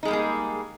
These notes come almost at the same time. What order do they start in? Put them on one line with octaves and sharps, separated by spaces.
D#4 G#3 G3 A#3 G#4